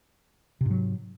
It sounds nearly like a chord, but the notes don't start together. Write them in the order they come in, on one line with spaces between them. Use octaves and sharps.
C3 G#2 F#3